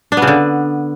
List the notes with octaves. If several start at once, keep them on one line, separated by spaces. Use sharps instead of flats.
D4
B3
C#3
D3